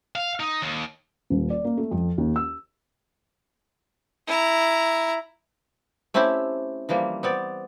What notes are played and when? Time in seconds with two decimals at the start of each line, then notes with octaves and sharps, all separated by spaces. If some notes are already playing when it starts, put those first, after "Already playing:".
0.15 F5
0.40 D#4
0.62 D#2
1.30 D#1
1.50 D5
1.64 A#3
1.77 A3
1.91 F2
2.18 D#2
2.36 E6
4.27 E4 A#5
6.14 A3 C4 C#4 E4 G4
6.89 E3 F3 G3 A#3
7.23 B3 C4 D5